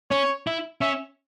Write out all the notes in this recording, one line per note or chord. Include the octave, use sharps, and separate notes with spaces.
C#4 C#5
E4
C#4 E5